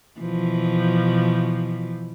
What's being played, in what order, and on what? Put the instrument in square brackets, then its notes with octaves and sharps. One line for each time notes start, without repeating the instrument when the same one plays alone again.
[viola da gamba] B2 E3 F3